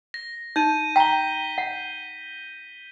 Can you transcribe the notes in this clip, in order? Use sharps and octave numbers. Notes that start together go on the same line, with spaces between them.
A#6
D#4 G6 D#7
G5 A#5 B6 G7
F#5